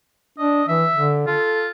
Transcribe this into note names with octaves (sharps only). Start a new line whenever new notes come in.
D4 D#5
E3 E5
D3
F4 A4